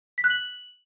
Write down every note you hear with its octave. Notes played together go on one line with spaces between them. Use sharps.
B6
F#6
F#7